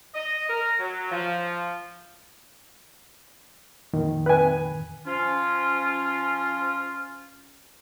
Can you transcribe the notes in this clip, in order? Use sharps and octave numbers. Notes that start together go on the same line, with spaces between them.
D#5
A#4
F#3
F3
F2 A#2 D#3
B4 G#5
F3 C#4 F4